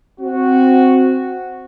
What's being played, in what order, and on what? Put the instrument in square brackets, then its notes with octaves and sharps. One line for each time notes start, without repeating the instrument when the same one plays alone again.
[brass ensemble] C4 F#4